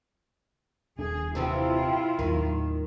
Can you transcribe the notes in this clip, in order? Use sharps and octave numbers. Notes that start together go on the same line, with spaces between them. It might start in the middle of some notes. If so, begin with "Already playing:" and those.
D#1 D4 G#4
C3 E3 C4 E4 F4
D#2 A2 D#3 F#3